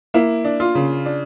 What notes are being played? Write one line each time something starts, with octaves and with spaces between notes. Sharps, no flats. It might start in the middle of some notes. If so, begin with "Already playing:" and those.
A#3 E4
D4
F4
C#3
D4